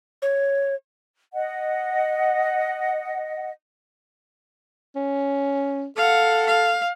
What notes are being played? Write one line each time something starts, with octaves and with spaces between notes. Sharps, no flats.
C#5
D#5 F#5
C#4
A4 F5 F#5
F5